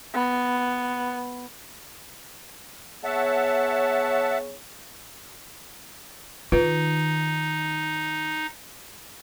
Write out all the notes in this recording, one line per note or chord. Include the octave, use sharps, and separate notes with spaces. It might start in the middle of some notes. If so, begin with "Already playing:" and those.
B3
B3 G#4 C#5 E5 F#5 A5
D#3 D#4 F4 B4